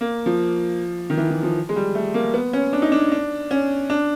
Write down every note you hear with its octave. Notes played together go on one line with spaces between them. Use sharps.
A#3
F3
D#3
E3
E3
F3
G#3
G3
A3
A#3
B3
C#4
D4
D#4
D4
D4
C#4
D4